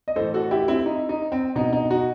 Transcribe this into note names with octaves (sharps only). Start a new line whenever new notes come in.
D#5
A2 E3 A4 C5
F#4 A4
E4 G4
C4 E4
D#4
D#4
C4
B2 D#4
D#4
D#4 F#4